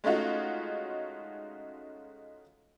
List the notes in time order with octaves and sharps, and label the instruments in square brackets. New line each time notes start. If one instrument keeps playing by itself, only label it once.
[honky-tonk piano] G#3 A3 C#4 D#4 F4 F#4